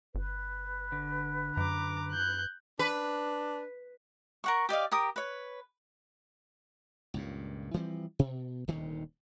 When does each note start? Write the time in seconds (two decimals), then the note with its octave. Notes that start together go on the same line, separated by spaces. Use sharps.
0.15 G1 B4
0.92 D3
1.57 F#2 A#5 D6
2.12 F#6 G6
2.79 D4 B4
4.44 A#4 F#5 C#6
4.69 G4 D5 D#5 F5
4.92 G4 A#4 D#6
5.16 B4 C#5
7.14 C#2 G2 A#2
7.74 E3 F3 G3 C4
8.19 B2
8.68 D#1 D2 C3 D#3